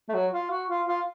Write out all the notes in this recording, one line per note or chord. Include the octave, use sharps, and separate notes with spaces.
A3
F#3
F4
F#4
F4
F4